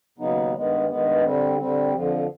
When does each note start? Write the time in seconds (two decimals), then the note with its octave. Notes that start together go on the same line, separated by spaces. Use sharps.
0.18 D#2 C#3 F#3 B3 D#4
0.53 G2 D#3 G#3 B3
0.88 G2 D#3 G#3 B3
1.23 D3 G3 C4
1.58 D3 G3 C4
1.93 F2 D3 F3